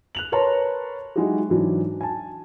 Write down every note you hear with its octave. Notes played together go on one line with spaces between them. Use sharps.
F#6 F7 F#7
A#4 B4 C#5 A5 A#5 C6
F#3 G#3 D#4 E4 F#4 G4
G#2 E3 F#3 D4
G#5 A5